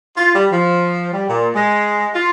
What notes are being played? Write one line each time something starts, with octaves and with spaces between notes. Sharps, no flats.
F4
G3
F3
G3
A#2
G#3
F4